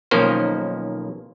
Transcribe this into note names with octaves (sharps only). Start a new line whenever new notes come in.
B1 D#3 F3 A#3 C#4 C5